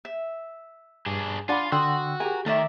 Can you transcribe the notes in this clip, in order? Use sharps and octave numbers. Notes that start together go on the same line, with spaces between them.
E5
G2 D4 G#4
D4 F4 D5 F#5 G#5 B5
D3 F#4 G5 C6 D#6 E6
G4 G#4 A#4 G#5 A#5
D#3 A3 A#4 D5 E5